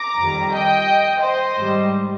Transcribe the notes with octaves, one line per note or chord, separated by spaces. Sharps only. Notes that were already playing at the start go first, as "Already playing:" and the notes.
Already playing: A#5 D6
F2 D#3 G3
D#5 G5
C5 D#5
G#2 D#3 G3